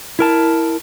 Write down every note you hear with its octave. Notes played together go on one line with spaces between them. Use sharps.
E4 A#4 A5